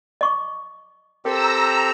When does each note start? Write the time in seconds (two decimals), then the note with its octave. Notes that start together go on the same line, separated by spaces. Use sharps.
0.21 D#5 C#6 D6
1.25 C4 G4 A4 A#4 A#5 E6